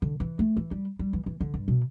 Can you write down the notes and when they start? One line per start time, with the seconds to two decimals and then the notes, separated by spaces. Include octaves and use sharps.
0.02 D3
0.20 E3
0.39 A3
0.57 E3
0.71 G3
0.99 G3
1.13 E3
1.26 E3
1.41 D3
1.54 G2
1.68 B2